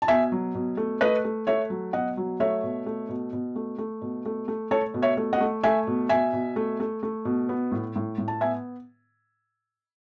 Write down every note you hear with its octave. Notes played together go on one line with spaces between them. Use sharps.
A5
B2 E5 G#5
F#3
B2
A3
A3 B4 D#5
A3
A3 C#5 E5
F#3
B2 D#5 F#5
F#3
A3 C#5 E5
B2
A3
B2
B2
A3
A3
B2
A3
A3
A3 A4 C#5
B2
C#5 E5
A3
D#5 F#5
A3
A3 E5 G#5
B2
B2 E5 G#5
B2
A3
A3
A3
B2
B3
A2
A2
A2
A5
B3 E5 G#5